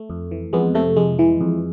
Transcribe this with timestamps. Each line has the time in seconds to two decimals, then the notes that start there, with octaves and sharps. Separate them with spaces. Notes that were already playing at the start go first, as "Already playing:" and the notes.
Already playing: A3
0.10 F2
0.31 E3
0.53 F2 G#3 B3
0.75 C3 A3
0.96 F2 G#3
1.19 E3
1.41 F2